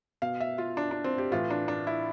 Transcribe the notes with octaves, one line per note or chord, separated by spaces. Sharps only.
B2 F5
E5
F4
D4
D4
C4
G4
A2 E3 F4
D4
D4
E4